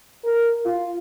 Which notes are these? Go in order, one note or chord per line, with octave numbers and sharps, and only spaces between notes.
A#4
F4